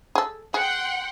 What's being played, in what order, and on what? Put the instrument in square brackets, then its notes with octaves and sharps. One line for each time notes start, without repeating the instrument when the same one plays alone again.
[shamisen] G#4 A4
[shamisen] G#4 [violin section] F#5 G5 C6